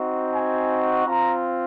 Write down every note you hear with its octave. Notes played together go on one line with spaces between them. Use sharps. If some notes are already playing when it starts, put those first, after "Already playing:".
Already playing: C4 D#4 F#4
G#5
C4 F4 A#5